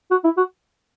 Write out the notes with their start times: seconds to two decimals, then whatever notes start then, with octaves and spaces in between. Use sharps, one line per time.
0.11 F#4
0.25 E4
0.37 F#4